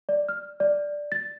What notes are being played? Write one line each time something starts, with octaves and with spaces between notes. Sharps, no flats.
D5
F6
D5
A6